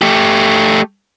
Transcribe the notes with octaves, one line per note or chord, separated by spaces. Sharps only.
A3 G4